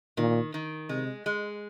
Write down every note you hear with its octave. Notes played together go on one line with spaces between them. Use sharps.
A#2 D#3
D#3
C3 G#3
G#3